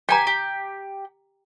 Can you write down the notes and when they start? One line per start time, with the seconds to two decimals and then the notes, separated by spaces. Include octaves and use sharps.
0.09 G4 G5 G#5 A#5
0.27 G4